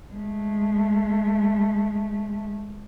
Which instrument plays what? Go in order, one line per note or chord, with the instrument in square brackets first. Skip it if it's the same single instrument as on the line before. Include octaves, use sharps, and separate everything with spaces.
[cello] G#3 A3